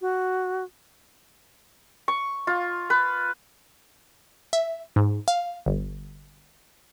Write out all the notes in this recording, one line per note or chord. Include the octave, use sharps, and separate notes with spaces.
F#4
C#6
F4
B4
E5
G#2
F5
G1